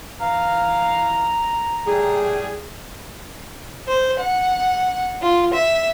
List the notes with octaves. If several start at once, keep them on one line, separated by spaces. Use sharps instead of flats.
E3 F5 A#5
A2 G3 G#4
C5
F#5
F4
E5